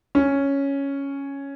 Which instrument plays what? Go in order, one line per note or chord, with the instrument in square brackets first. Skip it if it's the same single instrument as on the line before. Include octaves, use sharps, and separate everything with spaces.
[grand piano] C#4